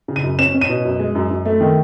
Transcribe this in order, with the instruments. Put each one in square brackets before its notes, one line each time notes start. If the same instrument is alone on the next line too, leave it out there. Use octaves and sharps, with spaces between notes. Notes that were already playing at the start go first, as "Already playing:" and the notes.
[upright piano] C#3
D#7
F#2
C#4 E7
C#4
D#7
B2
F#2
G#3
F#2
F#2
A3
D#3